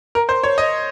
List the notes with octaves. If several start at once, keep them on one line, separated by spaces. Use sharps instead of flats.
A#4
C5
C#5
D#5